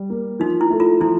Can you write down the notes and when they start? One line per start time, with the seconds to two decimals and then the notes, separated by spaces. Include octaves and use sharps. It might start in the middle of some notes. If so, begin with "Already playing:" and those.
Already playing: G3
0.10 A#3
0.40 F3 D#4
0.61 E4
0.70 A3
0.80 F4
1.00 F3 E4